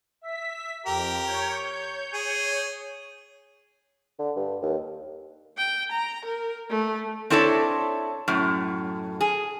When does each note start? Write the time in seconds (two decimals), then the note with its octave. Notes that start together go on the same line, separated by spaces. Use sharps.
0.21 E5 B6
0.86 F2 G4 A#4
1.23 C#5 G6
2.14 G#4
4.19 D3
4.37 G2
4.62 D#2
5.57 G5
5.91 A#5
6.25 A#4
6.70 A3
7.30 C4 D4 E4 A4 B4 C#5
8.28 F#2 A2
9.21 G#4